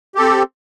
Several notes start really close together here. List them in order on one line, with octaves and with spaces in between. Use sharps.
G4 A4 C4